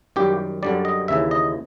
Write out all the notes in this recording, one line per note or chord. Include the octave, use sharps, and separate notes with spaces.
F#2 D#3 G3 G4
F#2 D3 G3 D5
D#5
D#2 C#3 E3 E5
D#5